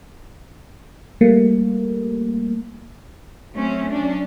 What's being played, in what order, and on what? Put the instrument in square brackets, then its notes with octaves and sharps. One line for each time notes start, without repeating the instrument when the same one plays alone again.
[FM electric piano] G3 A3 A#3
[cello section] F#3 A3 C4 C#4
F#3 C#4 D4